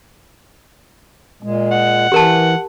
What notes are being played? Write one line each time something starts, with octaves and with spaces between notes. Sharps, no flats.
A#2 G#3
F#5
E3 G4 A#4 A5